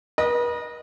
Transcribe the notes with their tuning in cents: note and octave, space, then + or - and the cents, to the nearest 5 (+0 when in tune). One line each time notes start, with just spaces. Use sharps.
B4 -45 D#5 -15